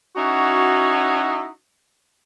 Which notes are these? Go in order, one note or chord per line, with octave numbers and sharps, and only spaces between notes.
C#4 D#4 E4 F#4